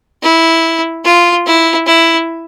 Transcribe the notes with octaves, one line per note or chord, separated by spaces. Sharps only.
E4
F4
E4
E4